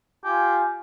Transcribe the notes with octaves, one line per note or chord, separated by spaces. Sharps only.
F4 G4 G#5